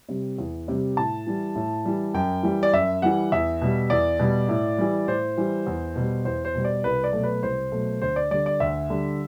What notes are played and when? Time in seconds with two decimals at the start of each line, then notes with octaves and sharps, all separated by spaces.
0.09 C3 G3
0.38 E2
0.68 C3 G3
0.97 A2 A5
1.27 E3 G3
1.56 A2
1.85 E3 G3
2.14 F#2 G5
2.43 E3 G3
2.63 D5
2.73 F#2 E5
3.02 E3 G3 F#5
3.32 E2 E5
3.62 B2 G3
3.90 E2 D5
4.19 B2 G3
4.49 A2
4.78 E3 G3
5.08 A2 C5
5.38 E3 G3
5.67 E2
5.96 B2 G3
6.25 E2 C5
6.45 C5
6.55 B2 G3
6.65 D5
6.84 C2 B4
7.04 D5
7.13 B2 F#3 A3
7.23 B4
7.42 C2 C5
7.72 B2 F#3 A3
8.01 D2 C5
8.16 D5
8.31 D3 G3 D5
8.46 D5
8.60 D2 E5
8.90 D3 G3